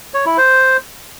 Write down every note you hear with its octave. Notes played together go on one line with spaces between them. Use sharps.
C#5
E4
C5